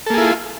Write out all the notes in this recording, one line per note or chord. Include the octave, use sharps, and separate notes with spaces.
A#3 E4 F4 G#4 A4